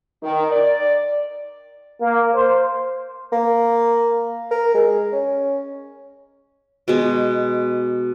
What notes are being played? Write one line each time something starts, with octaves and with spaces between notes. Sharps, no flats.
D#3
D5
A#3
C5
A#3
A#4
G#3
C#4
B2 G#3